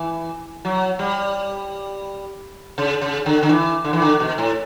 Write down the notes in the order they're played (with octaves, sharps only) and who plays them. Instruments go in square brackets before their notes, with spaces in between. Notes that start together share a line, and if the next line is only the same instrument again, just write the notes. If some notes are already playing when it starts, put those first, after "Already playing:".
Already playing: [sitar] E3
F#3
G3
C#3
C#3
D3
D3
E3
D3
E3
D3
B2
A2